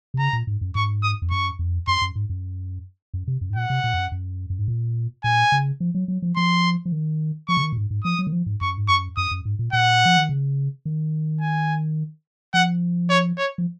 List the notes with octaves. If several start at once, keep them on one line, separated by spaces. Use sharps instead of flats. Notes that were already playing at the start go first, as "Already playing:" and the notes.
C3
C#3 A#5
A#2
G#2
F#2
G#2 C#6
D#6
F2
F#2 C#6
F2
F#2 C6
F#2
G#2
F#2
F#2
C3
F#2
G#2
A#2 F#5
C3
A#2
F2
F#2
F#2
F#2
G#2
A#2
A#2 G#5
C#3
F3
F#3
F#3
F3
F3 C6
F3
D#3
F3 C#6
C#3
D#3
A#2
G#2
G#2
F3 D#6
F#3
D#3
F3
G#2
F#2 C#6
G#2
F#2 C#6
F#2 D#6
F#2
G#2
A#2
A#2 F#5
F3
D#3
C#3
D#3
G#5
F3 F#5
C#5
C#5
F3